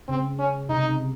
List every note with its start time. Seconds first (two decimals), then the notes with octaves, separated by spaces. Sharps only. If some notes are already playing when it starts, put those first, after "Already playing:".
0.08 C#3 C4
0.39 C#4
0.69 C3 D#4